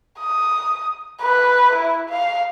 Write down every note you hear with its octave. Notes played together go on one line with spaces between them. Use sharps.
D#6
B4
E4
F5